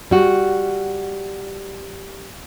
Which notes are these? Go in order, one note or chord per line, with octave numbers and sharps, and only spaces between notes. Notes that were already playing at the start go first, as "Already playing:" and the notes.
G3 F#4